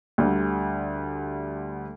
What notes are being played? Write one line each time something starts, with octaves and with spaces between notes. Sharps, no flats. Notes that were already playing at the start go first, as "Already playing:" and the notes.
D2 D3 G3